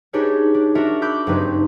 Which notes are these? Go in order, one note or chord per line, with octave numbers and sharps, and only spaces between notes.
D4 D#4 G4 G#4 B4 C#5
D4
D4 F#4 A#4 E5
B5 D6 E6 F#6 G6 B6
F#1 G2 F#3 C4 D#4 B4